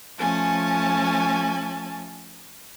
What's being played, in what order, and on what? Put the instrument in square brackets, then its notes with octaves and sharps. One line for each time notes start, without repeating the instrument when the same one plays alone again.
[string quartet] F3 A3 C#4 G#5 A5